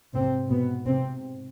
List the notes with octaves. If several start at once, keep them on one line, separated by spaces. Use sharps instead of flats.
G#2 C3 C4
B2 B3
C3 C4